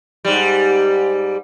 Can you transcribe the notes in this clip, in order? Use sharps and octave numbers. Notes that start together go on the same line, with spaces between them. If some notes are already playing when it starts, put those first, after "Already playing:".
G#2 G3